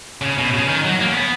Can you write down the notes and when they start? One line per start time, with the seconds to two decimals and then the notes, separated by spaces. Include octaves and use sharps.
0.22 C#3
0.38 B2
0.53 C#3
0.69 D#3
0.84 F#3
1.00 A#3
1.08 C#4
1.15 B3